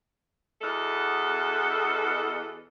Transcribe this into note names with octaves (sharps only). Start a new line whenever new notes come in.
E2 B2 A4